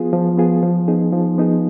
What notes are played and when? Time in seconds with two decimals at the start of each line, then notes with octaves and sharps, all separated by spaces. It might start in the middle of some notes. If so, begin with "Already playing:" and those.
Already playing: F3 B3 F4 G#4
0.13 F3
0.38 B3 F4 G#4
0.63 F3
0.88 B3 D#4 G#4
1.13 F3
1.38 B3 D#4 G#4